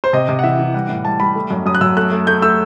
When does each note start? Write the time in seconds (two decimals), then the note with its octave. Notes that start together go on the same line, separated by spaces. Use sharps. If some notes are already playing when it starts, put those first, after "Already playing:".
0.04 C5
0.13 C3 D#5
0.29 C3
0.39 F#5
0.43 E3 E5
0.59 E3
0.74 G3 F#5
0.89 A2
1.05 G3 A5
1.20 G3 B5
1.35 A3
1.51 F#2
1.66 F#2 D#6
1.75 F#6
1.81 F#2 E6
1.97 A3 F#6
2.12 A3
2.27 A3 G6
2.42 A3 E6